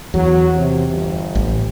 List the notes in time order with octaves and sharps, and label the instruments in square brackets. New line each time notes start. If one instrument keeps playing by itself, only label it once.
[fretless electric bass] E2 [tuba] F#3
[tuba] C3
G1
[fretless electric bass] A1